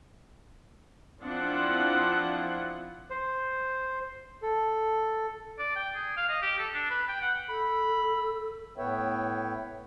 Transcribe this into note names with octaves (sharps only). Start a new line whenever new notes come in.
F3 C4 D4 E4 F4 F#5
C5
A4
D5
G5
G#4
F5
D#5
G4
A4
D4
B4
G5
F#5
A4 B5
A2 B3 B4 C#5 E5 G5